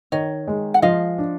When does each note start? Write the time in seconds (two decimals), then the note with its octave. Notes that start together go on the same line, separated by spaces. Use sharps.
0.12 D#3 C#5 D#5
0.48 G#3
0.74 F#5
0.82 F3 D#5 F5
1.18 D4